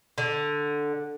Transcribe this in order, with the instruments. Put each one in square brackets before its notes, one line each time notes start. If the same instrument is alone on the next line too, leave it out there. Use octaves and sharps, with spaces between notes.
[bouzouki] D3